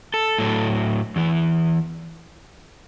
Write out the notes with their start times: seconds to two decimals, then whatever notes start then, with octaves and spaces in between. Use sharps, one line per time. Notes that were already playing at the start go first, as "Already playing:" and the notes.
0.14 A4
0.39 A2 F#3
1.16 E2 E3